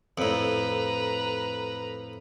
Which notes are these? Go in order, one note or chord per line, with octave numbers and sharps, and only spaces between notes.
F2 A2 B4 A#5